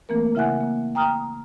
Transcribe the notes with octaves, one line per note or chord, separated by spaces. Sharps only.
E3 A3 A#3 C4 A#4
C#3 E4 E5 F#5 G#5 F#6
A#3
G5 A#5 D#6 F6